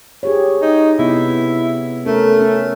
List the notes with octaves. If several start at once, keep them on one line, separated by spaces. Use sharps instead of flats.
G4 G#4 C#5
D#4
C3 B3 E4
A3 C#4 A#4
C#4 A4